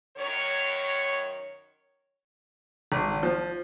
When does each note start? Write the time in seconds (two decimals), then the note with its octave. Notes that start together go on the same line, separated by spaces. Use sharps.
0.17 F#2 D#3 C#5
2.92 G#1
3.23 F3